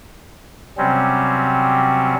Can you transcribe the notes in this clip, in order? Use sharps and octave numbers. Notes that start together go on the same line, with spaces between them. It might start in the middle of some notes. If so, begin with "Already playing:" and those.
C3 F#3 G3 C4 C#4